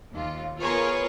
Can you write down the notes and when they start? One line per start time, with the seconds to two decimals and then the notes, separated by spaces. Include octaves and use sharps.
0.13 D#2 F4
0.61 B3 F4 G#4 A#4 B4 C#5